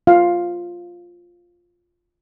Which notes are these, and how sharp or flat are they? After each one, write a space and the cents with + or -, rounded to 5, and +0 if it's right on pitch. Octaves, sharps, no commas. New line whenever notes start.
F4 +0 F5 +0